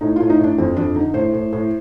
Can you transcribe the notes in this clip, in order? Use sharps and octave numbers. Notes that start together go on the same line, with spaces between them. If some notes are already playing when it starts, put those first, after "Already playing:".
A2 D#4
A2 F4
D#4
A2 D4
F2 C4
F2 D4
D3 D#4
A2 C5
A2
A2